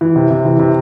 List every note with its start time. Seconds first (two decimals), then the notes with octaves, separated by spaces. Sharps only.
0.01 E3
0.16 C3
0.31 C3
0.45 E3
0.59 C3